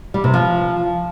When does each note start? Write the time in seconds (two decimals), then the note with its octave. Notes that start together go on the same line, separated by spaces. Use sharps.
0.14 G3
0.24 C3
0.34 F3